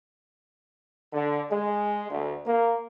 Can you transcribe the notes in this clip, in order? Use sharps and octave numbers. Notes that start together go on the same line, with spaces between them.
D3
G#3
D2
A#3